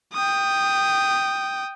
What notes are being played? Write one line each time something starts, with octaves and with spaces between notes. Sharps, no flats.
G5 D#6